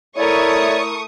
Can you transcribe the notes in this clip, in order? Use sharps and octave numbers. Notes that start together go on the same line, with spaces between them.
A3 E4 A#4 C#5 D5 E5 C#6 D#6